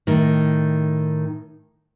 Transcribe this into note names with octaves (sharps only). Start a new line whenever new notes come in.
A2 D#3